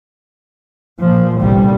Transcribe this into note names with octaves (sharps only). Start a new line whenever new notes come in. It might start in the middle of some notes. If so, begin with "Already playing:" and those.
A#2 F3
G1 C2 A#2 G3